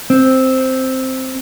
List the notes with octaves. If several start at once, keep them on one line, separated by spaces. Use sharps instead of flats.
C4